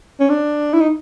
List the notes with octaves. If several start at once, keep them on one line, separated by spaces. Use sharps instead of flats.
C#4
D4
E4
D#4